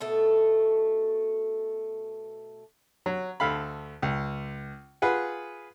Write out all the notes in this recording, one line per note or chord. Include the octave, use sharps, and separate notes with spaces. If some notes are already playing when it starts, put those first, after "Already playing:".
B2 A3 A4
F#3
D2 A4 F5 B5
C#2
F4 G#4 B4 F#5